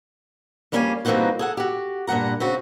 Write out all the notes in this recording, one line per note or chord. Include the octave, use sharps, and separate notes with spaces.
F2 G3 A#3 C#4 F5 G#5
G2 E3 A#3 C4 D#4 F#4
G#4 A4 F#5
F#4 G4
G2 A#2 A3 F#5 A#5
C#3 C4 F#4